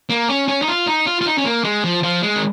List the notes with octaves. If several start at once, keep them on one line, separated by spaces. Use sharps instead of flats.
A#3
C#4
C#4
D#4
F4
D#4
F4
F4
D#4
C#4
A#3
G#3
F3
F3
G#3
D#3